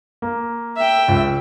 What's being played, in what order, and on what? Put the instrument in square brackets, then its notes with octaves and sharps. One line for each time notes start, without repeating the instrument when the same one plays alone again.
[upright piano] A#3
[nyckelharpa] E5 G5
[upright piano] C#2